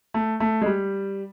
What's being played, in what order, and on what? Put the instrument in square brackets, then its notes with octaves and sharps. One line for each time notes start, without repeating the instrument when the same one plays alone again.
[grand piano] A3
A3
G#3
G3